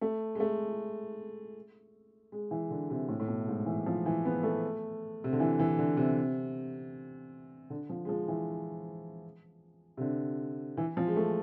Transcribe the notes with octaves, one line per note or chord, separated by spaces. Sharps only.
A3
G#3
A3
G#3
E3
D3
C3
A2
A2
B2
G#2
E3
F3
E3
B3
A3
C3
D3
E3
E3
D3
C3
D3
F3
G#3
F3
E3
C3
D3
E3
F3
G#3
A3